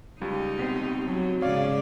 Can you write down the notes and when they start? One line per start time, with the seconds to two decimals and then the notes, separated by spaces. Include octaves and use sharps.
0.21 C#2 G3 D#4
0.59 B2 C4
1.06 F#3
1.42 G#2 C#3 C#5 D5 F5 D6